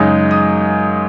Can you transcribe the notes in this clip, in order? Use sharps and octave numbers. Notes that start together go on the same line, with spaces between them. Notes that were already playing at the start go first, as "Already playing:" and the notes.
Already playing: F#2 C#3 G#3 D#4
D#6